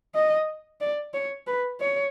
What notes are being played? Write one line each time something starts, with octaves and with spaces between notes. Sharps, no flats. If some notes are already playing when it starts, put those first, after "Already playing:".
D#5
D5
C#5
B4
C#5